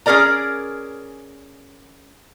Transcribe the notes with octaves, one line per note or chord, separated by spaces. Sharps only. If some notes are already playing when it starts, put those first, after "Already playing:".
C#4 G#4 A#4 D5 A#5